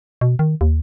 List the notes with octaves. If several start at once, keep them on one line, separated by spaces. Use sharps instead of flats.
B2
D#3
D#2